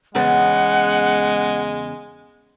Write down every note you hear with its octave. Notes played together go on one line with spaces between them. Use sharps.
E2 C#3 G#3 B3 F#5